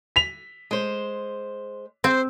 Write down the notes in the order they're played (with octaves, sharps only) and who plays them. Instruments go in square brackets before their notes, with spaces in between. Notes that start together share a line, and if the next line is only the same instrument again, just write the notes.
[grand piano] B6 F7
[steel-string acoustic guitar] G#3 C5
[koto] C4 [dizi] C5